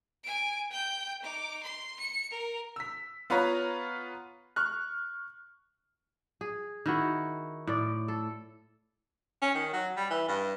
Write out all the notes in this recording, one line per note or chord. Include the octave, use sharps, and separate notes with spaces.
G#5 D7
G5 G6
D#4 D6
C6
C#7
A#4
E6 B6
B3 F4 B4 C#5 A#5
C#6 F6 F#6
G#4
D#3 E4 F#4
A2 D5
A4
C#4
D#3
F#3
G3
E3
G2